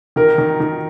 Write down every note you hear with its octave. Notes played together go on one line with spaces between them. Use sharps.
D#3 A#4
D#3
D#3